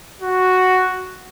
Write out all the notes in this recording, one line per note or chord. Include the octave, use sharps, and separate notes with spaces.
F#4